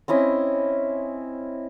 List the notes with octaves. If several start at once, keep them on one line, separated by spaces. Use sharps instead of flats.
C4 C#4 E4 D#5